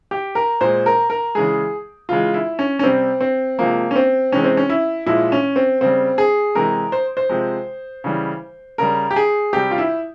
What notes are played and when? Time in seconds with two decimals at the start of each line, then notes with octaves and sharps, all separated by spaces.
0.11 G4
0.35 A#4
0.61 A#2 G#3 C5
0.86 A#4
1.10 A#4
1.35 C#3 E3 G#3 G#4
2.09 C#3 E3 G#3 F4
2.34 E4
2.59 C#4
2.79 C#4
2.83 C3 G3 C4
3.21 C4
3.59 C3 F3 G#3 A#3
3.91 C#4
3.96 C4
4.32 C3 E3 G#3 C#4
4.44 C4
4.57 C#4
4.69 E4
5.06 A#2 F3 G#3 E4
5.32 C#4
5.56 C4
5.81 C#3 G3 C4
6.18 G#4
6.55 C3 E3 G#3 A#4
6.92 C5
7.17 C5
7.29 C3 F3 G#3
8.04 C#3 E3 G3
8.78 C#3 G3 A#4
9.11 G4
9.16 G#4
9.53 C3 G3 G4
9.71 F4
9.78 E4